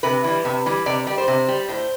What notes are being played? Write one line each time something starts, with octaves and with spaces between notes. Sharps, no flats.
C3 B4
E3 G3
C3
E3 G3
C3 D5
G3 D5
C5
C3
G3
A2 C5